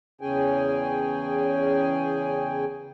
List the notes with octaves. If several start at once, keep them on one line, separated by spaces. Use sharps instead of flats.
E2 C#3 C#4 G#4 G5 G#5